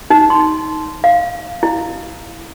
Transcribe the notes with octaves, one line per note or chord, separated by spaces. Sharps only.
D#4
C6
F5
E4